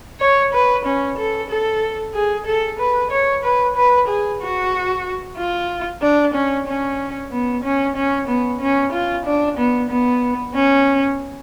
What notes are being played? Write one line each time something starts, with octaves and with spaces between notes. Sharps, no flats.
C#5
B4
C#4
A4
A4
G#4
A4
B4
C#5
B4
B4
G#4
F#4
F4
D4
C#4
C#4
B3
C#4
C#4
B3
C#4
F4
D4
B3
B3
C#4